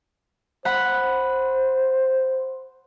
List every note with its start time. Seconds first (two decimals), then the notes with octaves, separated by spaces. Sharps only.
0.65 C5 F#5 B5